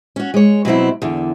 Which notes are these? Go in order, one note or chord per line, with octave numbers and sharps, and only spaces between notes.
C#4 F#4
G#3 C#5
B2 F#3 C4 E4
E2 D3